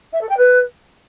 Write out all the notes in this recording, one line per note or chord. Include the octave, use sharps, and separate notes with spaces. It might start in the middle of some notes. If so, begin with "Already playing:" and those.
E5
A4
G5
B4